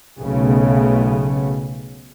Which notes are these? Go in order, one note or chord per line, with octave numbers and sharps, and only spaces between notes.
B1 C#3 A3 B3